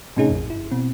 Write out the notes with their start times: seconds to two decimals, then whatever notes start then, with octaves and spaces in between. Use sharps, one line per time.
0.17 A2 C3 C#4 D#4 G#4
0.29 A#1 F2
0.48 G1 E4
0.71 B2 C4